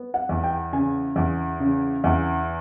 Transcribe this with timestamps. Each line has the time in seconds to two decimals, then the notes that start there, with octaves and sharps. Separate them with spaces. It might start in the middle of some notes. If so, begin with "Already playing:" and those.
Already playing: B3
0.14 F#5
0.29 E2
0.44 G5
0.73 C#3 G#5
1.16 E2
1.60 C#3
2.04 E2